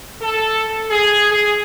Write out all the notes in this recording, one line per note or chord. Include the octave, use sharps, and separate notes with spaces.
A4
G#4
G#4